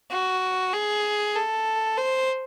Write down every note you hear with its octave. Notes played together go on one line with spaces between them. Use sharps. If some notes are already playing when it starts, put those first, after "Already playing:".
F#4
G#4
A4
C5